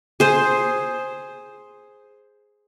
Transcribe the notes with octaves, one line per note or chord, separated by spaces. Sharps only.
G#4 C5